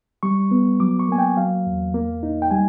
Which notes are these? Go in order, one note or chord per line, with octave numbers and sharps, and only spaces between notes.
G3 C#6
B3
F#3 D6
C#6
A#3 G#5
G5
F#3 F5
E2
A#3
D#4
G5
G3 G#5